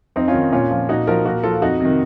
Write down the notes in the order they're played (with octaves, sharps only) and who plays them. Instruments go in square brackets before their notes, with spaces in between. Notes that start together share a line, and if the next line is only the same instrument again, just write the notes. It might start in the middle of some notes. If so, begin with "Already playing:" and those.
[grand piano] F2 C4 D#4
C#4 F4
D#3
A#2 C#4 F4
F3
A#2 D#4 F#4
F3 F#4 A#4
A#2 F#4 A#4
F3 F4 A4
F2 D#4 F#4
C3 D#3